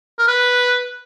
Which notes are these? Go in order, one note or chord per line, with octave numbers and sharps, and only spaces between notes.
A#4
B4